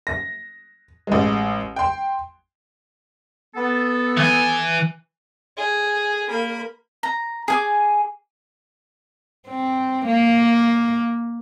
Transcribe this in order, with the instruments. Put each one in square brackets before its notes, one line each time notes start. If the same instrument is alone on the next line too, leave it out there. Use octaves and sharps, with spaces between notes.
[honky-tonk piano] A#6
A1 G#3
G5 C6
[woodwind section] B3 A4
[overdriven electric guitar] E3 G#5
[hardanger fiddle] G#4
A#3 B5
[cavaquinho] A#5
G#4 G#5 D6
[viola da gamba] C4
A#3